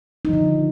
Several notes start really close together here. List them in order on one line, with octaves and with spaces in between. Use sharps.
D#4 F3 D3